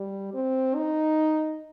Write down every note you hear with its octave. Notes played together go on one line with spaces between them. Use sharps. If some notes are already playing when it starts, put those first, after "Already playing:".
Already playing: G3
C4
D#4